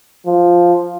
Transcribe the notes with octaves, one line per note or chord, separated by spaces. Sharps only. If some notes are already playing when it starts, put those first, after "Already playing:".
F3